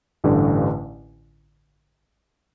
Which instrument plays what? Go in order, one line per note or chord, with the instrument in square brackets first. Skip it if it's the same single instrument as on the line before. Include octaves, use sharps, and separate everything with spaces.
[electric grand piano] A1 G2 D3